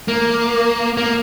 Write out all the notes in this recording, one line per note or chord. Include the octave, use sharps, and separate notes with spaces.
A#3
A#3